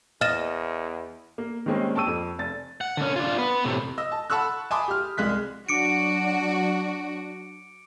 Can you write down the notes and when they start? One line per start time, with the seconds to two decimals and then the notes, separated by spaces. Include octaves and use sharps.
0.21 E2 D#5 F6 A6 E7
1.38 A#3
1.66 D#3 G3 G#3 A#3 C4 C#4
1.95 G5 A5 C#6 E6 D#7
2.07 F2
2.39 F1 A6
2.81 F#5
2.97 D3 C#4
3.16 D4 F4
3.38 B3 B4
3.65 A2 C3
3.98 D#5 E6
4.12 A5
4.30 F#5 A5 B5 C#6 E6 F#6
4.71 G#5 A5 B5 C6 D6 D#6
4.88 G4 F6
5.17 C2 G#3 F#6 B6
5.69 F#3 D4 F#4 D6 C#7 D7